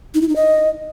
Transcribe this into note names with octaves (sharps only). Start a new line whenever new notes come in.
D#4
E4
D#4
D#5